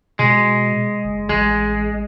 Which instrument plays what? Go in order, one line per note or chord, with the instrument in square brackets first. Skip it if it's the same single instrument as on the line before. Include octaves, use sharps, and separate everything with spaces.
[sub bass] B2 [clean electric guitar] G#3
[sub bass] F#1
[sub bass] A1 [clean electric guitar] G#3